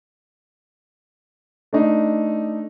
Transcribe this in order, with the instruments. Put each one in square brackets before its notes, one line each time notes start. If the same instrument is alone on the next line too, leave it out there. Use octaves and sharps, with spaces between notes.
[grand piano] A3 D4 D#4